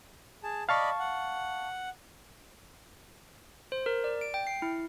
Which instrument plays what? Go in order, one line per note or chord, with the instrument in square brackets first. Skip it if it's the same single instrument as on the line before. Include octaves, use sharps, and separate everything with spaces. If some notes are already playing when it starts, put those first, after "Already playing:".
[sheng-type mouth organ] G#4 A5
[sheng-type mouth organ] D5 D#5 B5 [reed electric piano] F5 A5 C#6
[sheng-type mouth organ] F#5
[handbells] C5
A#4
D5
D7
G5
C7
E4